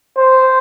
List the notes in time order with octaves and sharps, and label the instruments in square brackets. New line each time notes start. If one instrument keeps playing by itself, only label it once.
[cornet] C5